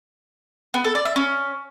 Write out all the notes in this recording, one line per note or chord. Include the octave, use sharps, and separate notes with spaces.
B3
A4
D5
E5
C#4